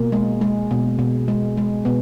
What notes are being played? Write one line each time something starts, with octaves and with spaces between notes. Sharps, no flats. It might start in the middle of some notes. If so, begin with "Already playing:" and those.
Already playing: B2 A#3
G#3
G#3
B2
B2
G#3
G#3
B2 B3